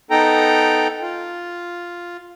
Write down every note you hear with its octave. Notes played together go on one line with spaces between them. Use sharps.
B3 D#4 A4 G5 A#5
F4